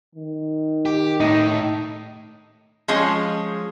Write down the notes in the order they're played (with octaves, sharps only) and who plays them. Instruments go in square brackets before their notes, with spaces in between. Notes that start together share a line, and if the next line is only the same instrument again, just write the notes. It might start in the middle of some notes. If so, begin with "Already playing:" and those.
[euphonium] D#3
[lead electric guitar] G4
[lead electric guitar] A2 [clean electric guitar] D#4
[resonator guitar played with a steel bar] F3 G#3 C#4